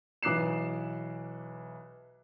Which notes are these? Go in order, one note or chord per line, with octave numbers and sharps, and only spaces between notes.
B1 E3 D6 F#6 C7 E7